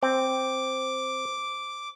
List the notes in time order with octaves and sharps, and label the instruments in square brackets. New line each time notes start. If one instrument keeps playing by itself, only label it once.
[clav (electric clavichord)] C4 [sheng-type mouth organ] D6